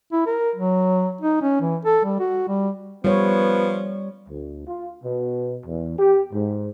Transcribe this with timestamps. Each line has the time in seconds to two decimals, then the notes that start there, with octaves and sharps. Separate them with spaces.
0.12 E4
0.26 A#4
0.56 F#3
1.21 D#4
1.42 C#4
1.61 E3
1.85 A4
2.04 G3
2.20 F#4
2.48 G3
3.04 F3 G3 B3 C#5
4.29 D2
4.67 F4
5.04 B2
5.66 E2
5.99 G4
6.33 G#2